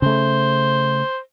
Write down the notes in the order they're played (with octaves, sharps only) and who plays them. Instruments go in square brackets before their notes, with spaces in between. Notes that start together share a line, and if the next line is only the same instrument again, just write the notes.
[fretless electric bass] C#3 A3 [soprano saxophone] C5